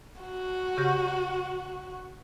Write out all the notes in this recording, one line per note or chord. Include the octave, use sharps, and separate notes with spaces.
F#4
C#3 G4 A#6